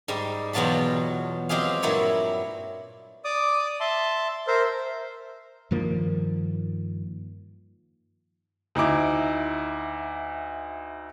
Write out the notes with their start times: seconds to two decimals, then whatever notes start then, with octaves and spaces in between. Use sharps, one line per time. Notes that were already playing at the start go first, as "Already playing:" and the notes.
0.08 G#2 G3 G#3
0.53 E2 B2 F#3 F4 A5 B5
1.49 F#3 G#3 C4 G4 G#4 F5
1.82 G2 A#2 F#3 E4 C#5 B5
3.25 D5 D6 D#6
3.80 E5 A5 C6
4.47 A#4 C5 E5
5.71 G2 D#3 F3 A#3
8.75 D2 D#4 E4 D6